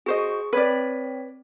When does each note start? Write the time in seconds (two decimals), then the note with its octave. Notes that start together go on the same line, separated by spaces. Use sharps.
0.06 F#4 G#4 C5 D#5 C#6
0.53 C4 B4 C#5 D5 B6